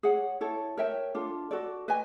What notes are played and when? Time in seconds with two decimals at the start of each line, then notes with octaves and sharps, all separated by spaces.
0.03 G#4 C#5 F#5
0.41 E4 A4 C#5
0.77 A#4 C#5 E5 G5
1.15 D4 F4 A4
1.51 F#4 A4 D5
1.88 B4 D#5 G#5